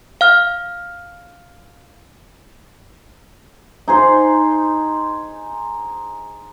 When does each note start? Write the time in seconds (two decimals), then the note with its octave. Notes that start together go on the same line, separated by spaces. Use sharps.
0.21 F5 F6
3.88 D#4 G#4 C5